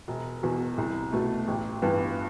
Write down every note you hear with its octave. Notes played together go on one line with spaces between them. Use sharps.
E1
E2 B2
C2
B2 A3
A1
G2 E3 B3